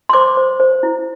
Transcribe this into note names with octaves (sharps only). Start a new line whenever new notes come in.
C6
C5 D6
C5
C5
E4